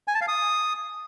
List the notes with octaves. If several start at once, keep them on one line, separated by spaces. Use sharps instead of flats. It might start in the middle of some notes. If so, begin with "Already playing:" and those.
G#5
A5
F5
D#6